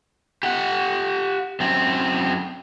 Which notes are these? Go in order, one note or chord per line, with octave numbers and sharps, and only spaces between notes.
G4 F#5
F#2 C4